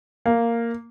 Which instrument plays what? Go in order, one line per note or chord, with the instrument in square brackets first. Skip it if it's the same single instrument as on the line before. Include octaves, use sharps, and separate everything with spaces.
[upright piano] A#3